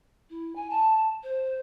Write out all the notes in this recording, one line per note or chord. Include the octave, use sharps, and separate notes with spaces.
E4
G#5
A5
C5